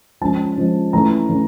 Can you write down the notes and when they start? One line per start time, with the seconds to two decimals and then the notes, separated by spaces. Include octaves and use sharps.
0.21 F3 G#3 C#4 A5
0.58 F3 G#3 C#4
0.93 E3 A3 C#4 A#5
1.29 E3 A3 C#4